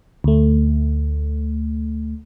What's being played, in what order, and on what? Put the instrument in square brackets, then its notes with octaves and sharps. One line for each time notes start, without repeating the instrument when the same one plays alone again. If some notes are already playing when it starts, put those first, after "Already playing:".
[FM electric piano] D2 A3